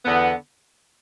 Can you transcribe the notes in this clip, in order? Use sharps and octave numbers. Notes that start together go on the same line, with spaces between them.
E2 D3 B3